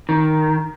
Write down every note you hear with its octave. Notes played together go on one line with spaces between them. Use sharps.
D#3